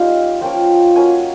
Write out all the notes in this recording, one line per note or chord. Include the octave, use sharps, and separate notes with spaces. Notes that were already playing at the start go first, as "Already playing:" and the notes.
Already playing: G3 A#3 C#4 D#4 F4 F5
F3 A#3 C#4 G5
F#3 A#3 C#4 G#5